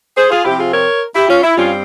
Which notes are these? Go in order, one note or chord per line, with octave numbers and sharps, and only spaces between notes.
G#4 C5
F4 G#4
C3 F3 C4 E4 G4
F4 G#4
A#4 C#5
E4 G4
C#4 F4
E4
G2 G3 C4 C#4 F4